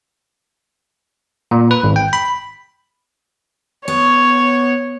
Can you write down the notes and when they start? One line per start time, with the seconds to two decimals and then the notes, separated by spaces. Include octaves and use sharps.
1.51 A#2
1.71 B4
1.83 G#1
1.96 G5
2.13 B5
3.88 B3 C#5